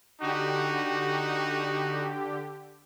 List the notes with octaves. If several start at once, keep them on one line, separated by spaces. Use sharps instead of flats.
D3 D#4 F#4 G4